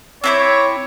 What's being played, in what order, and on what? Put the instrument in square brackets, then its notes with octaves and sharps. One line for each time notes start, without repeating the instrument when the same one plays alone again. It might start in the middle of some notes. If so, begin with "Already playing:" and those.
[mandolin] C4 E4 D6 [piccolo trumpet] C#5